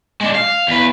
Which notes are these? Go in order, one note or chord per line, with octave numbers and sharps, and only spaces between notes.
G#3 D4
F5
E2 B4